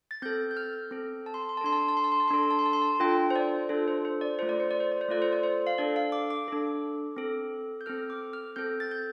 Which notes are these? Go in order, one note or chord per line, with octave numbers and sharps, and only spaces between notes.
A6
C4 A4 G6
G6
F6
C4 A4
A5
C6
A5
C6
A5
D4 A4 C6
A5
C6
A5
C6
A5
C6
A5
C6
D4 A4 A5
C6
A5
C6
A5
C6
A5
D4 F4 A4 G5
C5
D5
D4 F4 A4
C5
C5
D5
A3 F4 A4 C5
D5
C5
D5
C5
D5
C5
A3 F4 A4 D5
C5
D5
C5
F5
D4 A4 D5
F5
D6
D6
D4 A4
C4 A4
G6
C4 A4 F6
D6
F6
C4 A4 G6
A6
G6